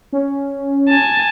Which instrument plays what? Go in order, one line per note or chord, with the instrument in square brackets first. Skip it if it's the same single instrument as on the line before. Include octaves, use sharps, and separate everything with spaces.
[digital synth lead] C#4
[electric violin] G#5 A5